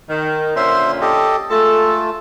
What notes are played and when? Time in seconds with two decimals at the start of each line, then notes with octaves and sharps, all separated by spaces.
0.09 D#3
0.56 A#2 D3 C#4 C5 E5 C6
1.01 G4 A4 D#5
1.50 G#3 A3 F4 A4